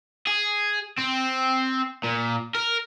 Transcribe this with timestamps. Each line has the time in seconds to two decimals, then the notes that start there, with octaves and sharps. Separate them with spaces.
0.27 G#4
0.98 C4
2.04 A#2
2.55 A#4